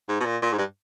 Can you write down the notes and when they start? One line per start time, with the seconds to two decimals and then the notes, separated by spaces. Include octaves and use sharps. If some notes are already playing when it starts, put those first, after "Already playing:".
0.08 G#2
0.20 B2
0.25 A#2
0.42 A#2
0.53 G#2
0.58 G2